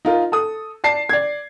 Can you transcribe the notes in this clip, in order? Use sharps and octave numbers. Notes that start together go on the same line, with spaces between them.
D#4 F4 A#4
A4 D#6
D5 A5 C7
D5 G#6